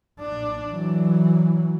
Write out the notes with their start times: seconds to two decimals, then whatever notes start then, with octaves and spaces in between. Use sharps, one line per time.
0.20 D4
0.71 E3 F#3